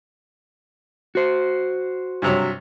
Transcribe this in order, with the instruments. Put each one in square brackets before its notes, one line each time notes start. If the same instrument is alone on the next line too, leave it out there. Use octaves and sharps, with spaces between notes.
[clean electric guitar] F#4 C5
[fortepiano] G2 C3 F#3